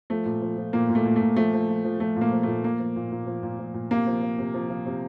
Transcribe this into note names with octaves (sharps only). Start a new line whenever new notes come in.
F3 A3
A#2
F3
F3
A#2 A#3
A#2
A3
A#2
A3
A#2
F3 A3
F3
F3
F3
F3 A3
A#2
A#3
F3
A#2 A3
F3 A#3
F3
A#2
A#2
F3
A#2
F3
A#2
C3 A#3
F3
F3
C3
F3
F3
C3